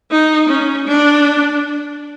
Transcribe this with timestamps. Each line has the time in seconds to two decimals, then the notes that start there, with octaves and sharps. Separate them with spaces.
0.11 D#4
0.49 C#4
0.87 D4